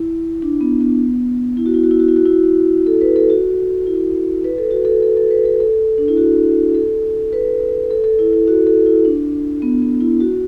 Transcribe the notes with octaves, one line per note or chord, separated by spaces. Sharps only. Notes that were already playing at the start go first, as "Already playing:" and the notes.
Already playing: E4
D4
B3
B3
E4
F#4
E4
F#4
E4
F#4
E4
F#4
E4
A4
B4
A4
F#4
E4
B4
A4
F#4
A4
A4
A4
B4
A4
A4
D4
E4
F#4
A4
B4
A4
A4
E4
E4
F#4
A4
E4
D4
B3
B3
E4
F#4